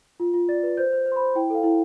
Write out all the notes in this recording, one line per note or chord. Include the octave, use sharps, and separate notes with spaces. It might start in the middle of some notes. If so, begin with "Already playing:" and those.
F4
F4
D5 A6
B4
C5 G6
C5
C5
C6
C5 B5
E4 G5
A4 F5
E4